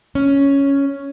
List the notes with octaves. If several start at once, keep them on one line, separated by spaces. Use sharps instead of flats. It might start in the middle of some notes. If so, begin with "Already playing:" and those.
C#4